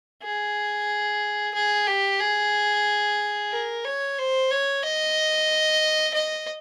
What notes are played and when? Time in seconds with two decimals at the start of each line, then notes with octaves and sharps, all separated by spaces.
0.23 G#4
1.54 G#4
1.87 G4
2.20 G#4
3.51 A#4
3.84 C#5
4.18 C5
4.51 C#5
4.83 D#5
6.14 D#5